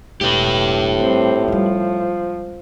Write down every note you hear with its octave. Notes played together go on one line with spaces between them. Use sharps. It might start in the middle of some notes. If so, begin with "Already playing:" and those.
E1 A2 G4 B4
G3 C4
F3 G3 G#3